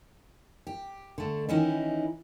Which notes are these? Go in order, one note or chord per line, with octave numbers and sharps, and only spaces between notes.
G4
D3 A3
D#3 E3 C#4 D#4 E4